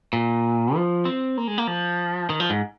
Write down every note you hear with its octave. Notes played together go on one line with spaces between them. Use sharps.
A#2
F3
C4
A#3
G#3
A#3
F3
D#3
F3
G#2